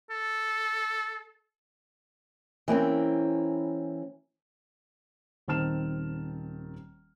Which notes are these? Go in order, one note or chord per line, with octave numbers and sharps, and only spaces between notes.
A4
E3 A#3 C4 C#4
D#1 D#3 C4 A5 F6 E7